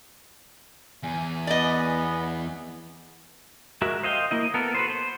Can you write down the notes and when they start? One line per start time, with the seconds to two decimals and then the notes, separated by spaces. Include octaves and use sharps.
1.03 E2 G#5
1.47 B3 D5 D#5
3.82 G#3 F#4 A#4 E5
4.03 C5 D#5 F5 G5
4.31 A#3 E4 D#5
4.54 B3 A4 A#4
4.75 F#4 B4 C5
4.90 C5